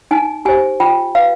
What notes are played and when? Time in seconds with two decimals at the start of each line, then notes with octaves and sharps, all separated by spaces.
0.11 D#4 G#5
0.45 G4 C5 G#5
0.80 F4 G5
1.15 B4 F5